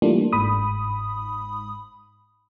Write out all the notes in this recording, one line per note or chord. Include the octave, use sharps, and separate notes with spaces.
E3 G3 A3 A#3 D4 F4
G1 G#2 B5 D#6